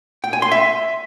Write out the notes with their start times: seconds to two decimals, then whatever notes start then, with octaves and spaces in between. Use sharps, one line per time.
0.24 G5
0.33 G#5
0.42 C6
0.52 E5